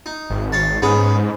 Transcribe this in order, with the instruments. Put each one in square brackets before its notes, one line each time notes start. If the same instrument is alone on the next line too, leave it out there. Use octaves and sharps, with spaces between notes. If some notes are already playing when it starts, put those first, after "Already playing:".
[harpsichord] D#4
[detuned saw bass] G#1
[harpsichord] C#5 F5 A5
[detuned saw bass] G#2 [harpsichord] B3 C#4 G#4